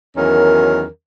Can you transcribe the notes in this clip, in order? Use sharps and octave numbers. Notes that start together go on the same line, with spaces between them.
E2 D#3 F#3 C#4 A#4